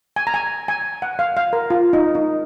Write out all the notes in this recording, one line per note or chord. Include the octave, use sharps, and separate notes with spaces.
G#5
A#5
G#5
G#5
F#5
F5
F5
A#4
F4
D#4
D#4